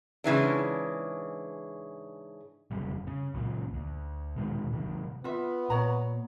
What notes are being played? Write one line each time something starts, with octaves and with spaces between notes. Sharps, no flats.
G#2 C#3 E3 D4
F1 F#2 C#3 G3
C#3
C#2 F#2 A#2
D2
D#1 B2 D#3 G#3
C3 D#3 F#3
B3 F4 E5
A#2 C#5 A#5